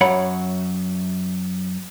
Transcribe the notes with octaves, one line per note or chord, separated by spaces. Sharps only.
F#2 C#5 F#5 B5